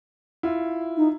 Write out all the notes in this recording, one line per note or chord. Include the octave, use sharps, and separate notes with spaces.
E4 F4
D#4